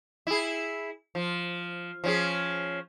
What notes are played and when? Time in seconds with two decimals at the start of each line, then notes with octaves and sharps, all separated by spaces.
0.27 E4 G#4
1.15 F3
2.04 F3 C#4 G#4